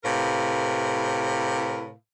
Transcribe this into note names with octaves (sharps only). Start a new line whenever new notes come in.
A2 C3 A#4 B4 F5